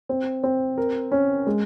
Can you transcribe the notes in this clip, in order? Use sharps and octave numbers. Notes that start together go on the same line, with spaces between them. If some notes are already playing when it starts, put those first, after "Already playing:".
C4
C4
A#4
C#4
G#3